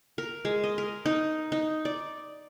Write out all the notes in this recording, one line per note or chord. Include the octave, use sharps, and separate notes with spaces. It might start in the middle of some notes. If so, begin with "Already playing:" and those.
A#4
G#3
D#5
A#4
D#4
D#4
D5